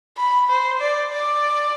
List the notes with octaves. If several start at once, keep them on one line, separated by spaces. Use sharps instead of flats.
B5
C5
D5
D5